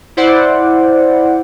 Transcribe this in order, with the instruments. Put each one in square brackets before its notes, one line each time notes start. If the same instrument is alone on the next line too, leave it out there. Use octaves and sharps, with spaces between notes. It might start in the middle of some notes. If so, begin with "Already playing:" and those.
[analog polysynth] E4 C5 D5 F#5